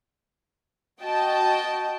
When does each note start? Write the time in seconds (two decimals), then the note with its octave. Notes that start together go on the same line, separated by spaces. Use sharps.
1.02 F#4 D#5 G5 A5